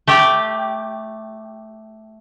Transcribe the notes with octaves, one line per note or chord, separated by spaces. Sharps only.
A3 G4